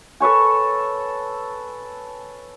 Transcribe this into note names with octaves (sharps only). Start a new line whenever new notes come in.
A4 B4 C#5 G#5